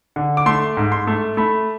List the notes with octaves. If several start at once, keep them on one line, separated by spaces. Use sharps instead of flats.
D3
D6
A3 C6
G#2
C6
A3
A3 B5